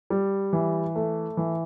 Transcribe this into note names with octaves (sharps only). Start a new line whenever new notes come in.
G3
E3
A3
E3